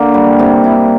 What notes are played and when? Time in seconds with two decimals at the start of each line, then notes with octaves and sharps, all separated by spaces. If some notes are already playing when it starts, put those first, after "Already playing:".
Already playing: D3 A#3
0.14 G3
0.39 C3
0.64 E4